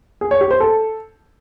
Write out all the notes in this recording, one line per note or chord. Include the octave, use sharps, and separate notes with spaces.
G#4
C#5
G4
C5
A4